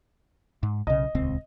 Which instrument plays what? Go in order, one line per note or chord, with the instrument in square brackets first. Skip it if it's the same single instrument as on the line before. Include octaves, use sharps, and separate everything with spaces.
[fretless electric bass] G#2
[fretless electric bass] B1 C#3 [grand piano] D#5
[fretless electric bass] D#1 C#2 C4